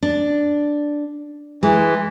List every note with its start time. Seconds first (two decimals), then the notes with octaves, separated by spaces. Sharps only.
0.03 D4
1.63 E3 G#3